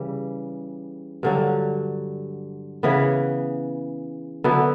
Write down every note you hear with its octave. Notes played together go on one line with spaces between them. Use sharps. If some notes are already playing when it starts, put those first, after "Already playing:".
Already playing: C#3 E3 G3
G2 D3 F#3
C#3 E3 B3
D3 F#3 B3 E4